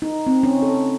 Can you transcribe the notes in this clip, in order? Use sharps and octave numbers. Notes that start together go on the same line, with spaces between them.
D#4
C4
C#4
A4